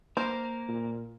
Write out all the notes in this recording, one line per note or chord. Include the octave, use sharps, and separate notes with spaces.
A#3 A#4 C5
A#2